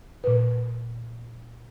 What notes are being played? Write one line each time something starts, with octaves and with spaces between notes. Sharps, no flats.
A#2 B4